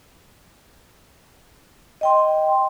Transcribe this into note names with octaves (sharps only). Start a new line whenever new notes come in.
D#5 G5 C6